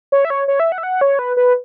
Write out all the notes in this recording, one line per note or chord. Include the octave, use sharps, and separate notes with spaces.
C#5
E5
C#5
C#5
E5
F#5
E5
F#5
C#5
B4
B4